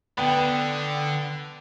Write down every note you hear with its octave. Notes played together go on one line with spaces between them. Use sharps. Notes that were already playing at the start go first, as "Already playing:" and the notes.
D3 B3 G5